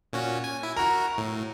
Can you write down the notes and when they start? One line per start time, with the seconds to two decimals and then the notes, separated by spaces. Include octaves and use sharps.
0.13 A#2 C#4 F#4
0.44 G#5
0.63 E4
0.77 F#4 A#4 A#5
1.18 A2